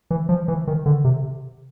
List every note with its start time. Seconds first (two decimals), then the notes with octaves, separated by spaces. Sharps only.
0.11 E3
0.29 F3
0.48 E3
0.67 D#3
0.86 D3
1.04 C3